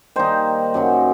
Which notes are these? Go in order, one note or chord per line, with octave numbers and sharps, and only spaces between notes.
D#3 G3 A#3 D#4 C5
F#2 C#3 F#3